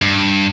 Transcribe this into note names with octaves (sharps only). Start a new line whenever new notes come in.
G2